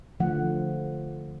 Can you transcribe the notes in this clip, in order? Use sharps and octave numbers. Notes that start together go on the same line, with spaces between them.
D3 F3 A3 F#5